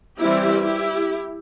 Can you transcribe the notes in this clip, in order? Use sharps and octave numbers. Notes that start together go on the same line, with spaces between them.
E3 G3 C4 E4 G4
E4 G4